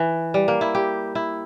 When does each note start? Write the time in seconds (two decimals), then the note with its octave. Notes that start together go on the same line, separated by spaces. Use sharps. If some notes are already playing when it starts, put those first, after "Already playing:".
Already playing: E3
0.34 G3
0.48 A#3
0.61 E4
0.75 G4
1.15 E4